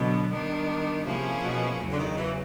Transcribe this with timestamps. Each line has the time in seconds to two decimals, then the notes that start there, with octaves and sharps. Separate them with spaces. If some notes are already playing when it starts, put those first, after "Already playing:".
Already playing: B2 D3 F#3 B3
0.30 D#3 G3 B3 D4
1.05 C3 F3 A#3 C#4 E4 G#4
1.43 B2
1.80 E2 C#3 F#3
1.92 D3
1.99 D#3
2.18 E3